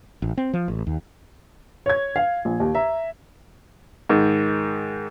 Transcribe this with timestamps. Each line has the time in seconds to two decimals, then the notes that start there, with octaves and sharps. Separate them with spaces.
0.22 A1
0.37 C4
0.53 F3
0.68 A1
0.87 D#2
1.86 C#5 G#6
2.16 F5
2.45 A#1
2.60 D#2
2.75 E5 A#5
4.09 G#2 D#3